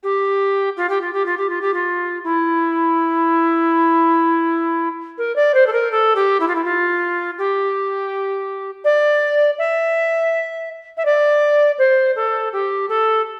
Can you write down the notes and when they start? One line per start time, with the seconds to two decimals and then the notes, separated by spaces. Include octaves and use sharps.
0.03 G4
0.77 F4
0.89 G4
1.01 F4
1.13 G4
1.26 F4
1.37 G4
1.50 F4
1.62 G4
1.74 F4
2.24 E4
5.18 A#4
5.36 D5
5.54 C5
5.67 A4
5.73 A#4
5.92 A4
6.16 G4
6.40 E4
6.48 F4
6.55 E4
6.65 F4
7.38 G4
8.85 D5
9.59 E5
10.97 E5
11.05 D5
11.78 C5
12.16 A4
12.53 G4
12.89 A4